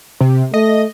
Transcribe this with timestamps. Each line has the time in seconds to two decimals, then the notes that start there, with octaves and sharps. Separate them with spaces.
0.21 C3
0.54 A3 D#5